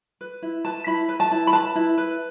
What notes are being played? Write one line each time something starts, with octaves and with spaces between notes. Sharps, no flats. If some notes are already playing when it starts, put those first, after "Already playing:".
B4
E4
B4 A5
E4 B5
B4
A5
E4
B5
B4 A5
E4
B4